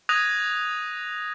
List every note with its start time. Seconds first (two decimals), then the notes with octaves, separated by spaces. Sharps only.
0.09 D#6 F#6 G#6 A#6 D#7 F7